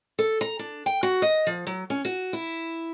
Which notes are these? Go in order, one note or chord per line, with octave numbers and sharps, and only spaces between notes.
A4
A#5
D4
G5
F#4
D#5
F3
F#3
C#4
F#4
E4